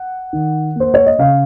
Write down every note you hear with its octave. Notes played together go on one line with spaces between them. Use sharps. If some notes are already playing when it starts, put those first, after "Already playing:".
Already playing: F#5
D#3
A#3 C5
C#5
D#5
C#3 F5